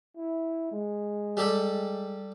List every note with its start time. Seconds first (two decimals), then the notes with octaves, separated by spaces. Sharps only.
0.17 E4
0.72 G#3
1.37 G3 G4 A4